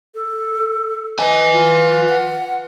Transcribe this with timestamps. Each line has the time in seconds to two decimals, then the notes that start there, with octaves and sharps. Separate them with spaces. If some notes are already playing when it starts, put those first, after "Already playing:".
0.15 A4
1.19 B4 D#5 G#5
1.53 F4
2.09 F#5